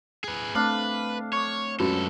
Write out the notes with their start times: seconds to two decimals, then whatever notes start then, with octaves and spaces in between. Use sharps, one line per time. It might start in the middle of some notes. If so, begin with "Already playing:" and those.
0.24 G#4 B4
0.55 A3 C4 D4 B4 F5
1.33 C#5 C#6 D6
1.80 F#2 G#3 C#4 F4 F#4 A4 B4